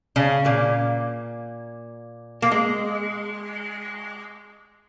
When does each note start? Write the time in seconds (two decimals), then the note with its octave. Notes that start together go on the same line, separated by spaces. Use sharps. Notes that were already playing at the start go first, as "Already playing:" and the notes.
0.16 C#3 C#4
0.45 A#2 A#3
2.42 A#3
2.51 G#3